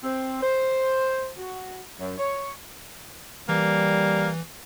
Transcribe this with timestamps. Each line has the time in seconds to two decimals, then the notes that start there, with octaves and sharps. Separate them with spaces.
0.04 C4
0.42 C5
1.39 F#4
1.99 F#2
2.18 C#5
3.49 E3 G3 A#3